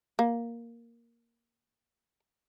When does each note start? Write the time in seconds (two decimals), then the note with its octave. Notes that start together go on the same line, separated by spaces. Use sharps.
0.19 A#3